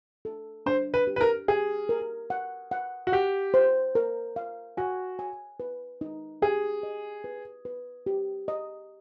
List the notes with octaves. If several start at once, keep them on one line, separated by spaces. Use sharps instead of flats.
A4
D4 C5
B4
G4
B4
A#4
G4 G#4
A#4
F#5
F#5
F#4
G4 F#5
C5
A#4
F5
F#4 G#5
G#5
B4
D#4
G4 G#4
D#5
B4
B4
G4
D#5